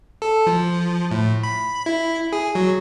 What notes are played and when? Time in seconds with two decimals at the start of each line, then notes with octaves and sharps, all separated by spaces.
0.22 A4
0.47 F3
1.11 A2
1.43 B5
1.86 E4
2.33 G#4
2.55 F#3